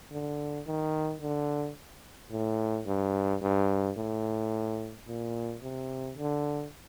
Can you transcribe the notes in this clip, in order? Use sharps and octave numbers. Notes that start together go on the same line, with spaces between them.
D3
D#3
D3
A2
G2
G2
A2
A#2
C3
D3